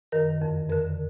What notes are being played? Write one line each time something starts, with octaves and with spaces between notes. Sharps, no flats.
F#2 D#3 A#4
F2 D3
F2 D3 A#4